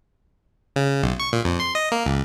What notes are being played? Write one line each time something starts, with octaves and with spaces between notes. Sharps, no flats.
C#3
B1
C#6
A#2
F2
C6
D#5
A#3
C#2